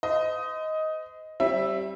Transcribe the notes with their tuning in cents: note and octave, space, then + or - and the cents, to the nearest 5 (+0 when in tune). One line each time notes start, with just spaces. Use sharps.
C5 -40 D#5 +10
G3 -10 C4 +35 E5 +0